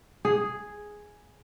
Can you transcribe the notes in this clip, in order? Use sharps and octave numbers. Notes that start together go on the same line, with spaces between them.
G#4